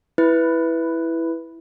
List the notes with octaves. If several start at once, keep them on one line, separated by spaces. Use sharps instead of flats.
E4 B4